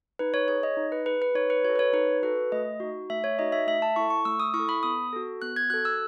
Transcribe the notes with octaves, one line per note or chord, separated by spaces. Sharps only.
D#4 B4
C#5
G#4 C#5
D#5
D#4
B4
G#4 B4
B4
D#4 C#5
B4
F#4 C#5
A4
B4
C#5
D#4 B4
F#4 A4 B4
A3 D#5
D#4 F#4
A3 E5
C#5
D#4 F#4 D#5
E5
A3 E5
A5
E4 A4 C#6
C#6
A3 E6
D#6
E4 C#6
A4
B5
B3 D#6
F#4 A4
B3 F#6
G#6
F#4 A4 F#6
E6